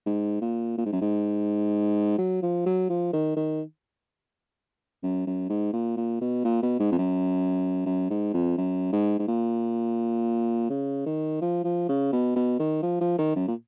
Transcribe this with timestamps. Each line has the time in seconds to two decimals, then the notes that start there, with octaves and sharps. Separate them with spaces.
0.06 G#2
0.42 A#2
0.78 A#2
0.86 G#2
0.93 F#2
1.01 G#2
2.18 F#3
2.42 F3
2.66 F#3
2.89 F3
3.13 D#3
3.37 D#3
5.03 F#2
5.27 F#2
5.49 G#2
5.73 A#2
5.97 A#2
6.21 B2
6.45 A#2
6.62 B2
6.80 G#2
6.92 F2
6.98 F#2
7.86 F#2
8.10 G#2
8.34 F2
8.58 F#2
8.93 G#2
9.19 G#2
9.28 A#2
10.70 C#3
11.06 D#3
11.41 F3
11.64 F3
11.89 C#3
12.13 B2
12.36 B2
12.59 D#3
12.83 F3
13.01 F3
13.19 D#3
13.36 F#2
13.48 A#2